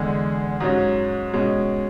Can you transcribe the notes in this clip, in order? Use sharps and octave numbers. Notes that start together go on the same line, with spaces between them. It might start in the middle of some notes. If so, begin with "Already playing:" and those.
Already playing: E2 D3 G#3
G#2 F#3 C#4 F#4
B2 G#3 C#4